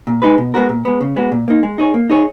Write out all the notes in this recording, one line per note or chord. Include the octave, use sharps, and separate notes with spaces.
A#2
G#3 D#4 G#4 B4
B2
G#3 B3 F#4 A#4
A#2
G#3 B3
C#3
G#3 B3 F#4
A#2
A#3 D#4
G#3
D#4 G#4 C#5
A#3
D#4 G#4 C#5